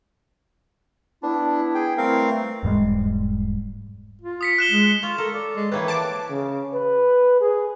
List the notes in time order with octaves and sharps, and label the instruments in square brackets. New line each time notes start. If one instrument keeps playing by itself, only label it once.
[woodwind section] B3 E4 [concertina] D4
[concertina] G#4 G5
[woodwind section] E3 G3 A3 [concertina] C4 A#4 F5
[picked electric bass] E1 G#2 G3 G#3
[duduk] F4
[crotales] D#6 B6 C#7
F#6 E7 G7
[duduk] G#3
[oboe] F4 [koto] C#5
[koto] A4 [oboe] A#4
[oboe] D5
[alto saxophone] G#3
[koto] E3 A#3 C4 [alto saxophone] B4 [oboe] C#5
[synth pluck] A5 D6
[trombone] C#3
B4
G#4